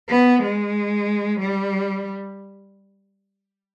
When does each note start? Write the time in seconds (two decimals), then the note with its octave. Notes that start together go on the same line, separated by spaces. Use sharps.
0.10 B3
0.43 G#3
1.41 G3